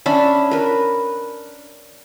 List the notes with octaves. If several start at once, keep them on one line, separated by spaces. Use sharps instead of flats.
C#4 D4 E5 B5
A#4 B4